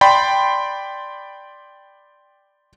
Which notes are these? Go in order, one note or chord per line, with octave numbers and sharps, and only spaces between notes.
D5 G5 B5 C6